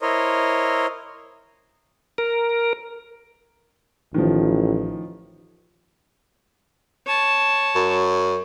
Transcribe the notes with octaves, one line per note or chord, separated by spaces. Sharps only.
E4 A#4 C5 C#5 D#5
A#4
A1 D#3 F3
C#5 A5
F#2